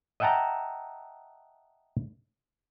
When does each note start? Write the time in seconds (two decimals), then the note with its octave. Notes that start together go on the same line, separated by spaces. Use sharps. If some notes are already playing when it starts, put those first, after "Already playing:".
0.20 D#5 E5 F#5 G5 A5 A#5